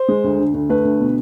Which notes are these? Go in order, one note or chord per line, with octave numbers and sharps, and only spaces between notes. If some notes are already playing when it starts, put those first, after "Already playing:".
Already playing: C5
G#3
D2
D3
D2
A3 B4
D2
B2